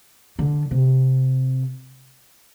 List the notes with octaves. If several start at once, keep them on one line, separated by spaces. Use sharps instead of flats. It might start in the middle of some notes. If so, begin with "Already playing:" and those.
D3
C3